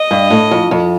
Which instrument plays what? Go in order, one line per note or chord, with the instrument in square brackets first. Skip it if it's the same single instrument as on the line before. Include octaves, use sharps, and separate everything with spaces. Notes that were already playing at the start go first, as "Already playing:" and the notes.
Already playing: [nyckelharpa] D#5
[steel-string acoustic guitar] G2
A2
F2
F2